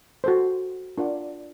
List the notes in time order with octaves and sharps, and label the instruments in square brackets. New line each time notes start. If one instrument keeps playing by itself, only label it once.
[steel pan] F#4 A4 C5
D4 F4 A#4 D5 F#5